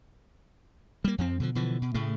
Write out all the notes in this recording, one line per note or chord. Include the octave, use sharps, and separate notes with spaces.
G3 A#3
F2 F3 C4
B2 D3 F3
B2 D3 E3 F3
B2
A2 C#3 A3